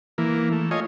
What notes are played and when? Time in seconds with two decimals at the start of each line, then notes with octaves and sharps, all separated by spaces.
0.18 E3 A#3
0.52 A3
0.71 F4 C#5 D#5 G#5